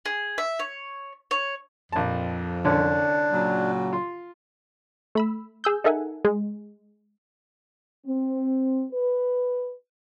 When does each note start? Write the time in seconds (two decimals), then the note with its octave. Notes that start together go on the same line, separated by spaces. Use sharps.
0.05 G#4
0.38 E5
0.59 C#5
1.31 C#5
1.92 A#1 F2 A5
2.65 C2 D3 C#4 D4
3.32 A#2 C#3 F#3
3.93 F4
5.15 A3 B5 E6
5.64 G#4 E6 G6
5.84 D#4 A4 A#4 E5 F#5 G#5
6.25 G#3
8.06 C4
8.93 B4